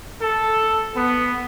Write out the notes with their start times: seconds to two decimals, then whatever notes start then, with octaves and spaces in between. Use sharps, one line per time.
0.21 A4
0.95 B3